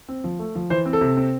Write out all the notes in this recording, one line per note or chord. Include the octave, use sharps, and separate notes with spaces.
C4
F3
A3
F3
E3 C5
C4
A4
C3
C4